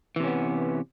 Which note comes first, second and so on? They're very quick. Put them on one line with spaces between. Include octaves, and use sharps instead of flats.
E3 C3 C#4 B3